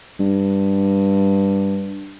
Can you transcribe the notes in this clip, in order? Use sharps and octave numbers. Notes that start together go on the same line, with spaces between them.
G2